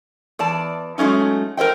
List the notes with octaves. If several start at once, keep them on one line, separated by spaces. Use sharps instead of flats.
E2 D5 A5
F#3 G#3 A3 C#4 D#4
A#4 C5 D#5 G5